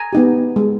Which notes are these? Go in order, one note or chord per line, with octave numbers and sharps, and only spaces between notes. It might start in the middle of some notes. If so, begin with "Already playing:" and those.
Already playing: G#5 A#5
B3 D#4 G4
G#3